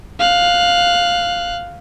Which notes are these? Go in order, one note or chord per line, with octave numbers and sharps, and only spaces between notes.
F5 F#6